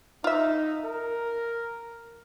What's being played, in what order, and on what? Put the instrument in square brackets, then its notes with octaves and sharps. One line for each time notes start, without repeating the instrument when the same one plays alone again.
[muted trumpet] D#4 [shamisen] F4 E5
[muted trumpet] A#4